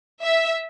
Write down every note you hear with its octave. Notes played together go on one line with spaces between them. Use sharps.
E5